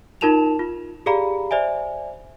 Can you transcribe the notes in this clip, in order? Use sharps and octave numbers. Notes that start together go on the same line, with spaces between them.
D#4 F4 A#4 A5 E7 F7
F4
G4 G#4 D5 F5 A#5 B5
C5 D5 E5 G#5